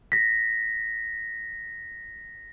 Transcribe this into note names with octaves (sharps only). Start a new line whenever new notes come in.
A#6 B6